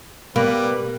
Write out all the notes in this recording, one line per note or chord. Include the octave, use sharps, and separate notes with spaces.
B2 G3 A#3 B3 B4